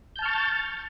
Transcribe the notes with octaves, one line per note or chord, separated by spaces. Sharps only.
A5 C#6 F6 G6 A6